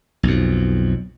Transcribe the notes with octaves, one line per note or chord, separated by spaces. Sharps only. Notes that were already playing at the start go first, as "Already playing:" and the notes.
B1 F2